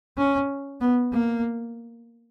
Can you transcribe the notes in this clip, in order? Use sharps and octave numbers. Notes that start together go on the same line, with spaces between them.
C#4
B3
A#3